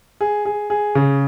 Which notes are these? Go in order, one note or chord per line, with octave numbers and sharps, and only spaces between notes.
G#4
G#4
G#4
C#3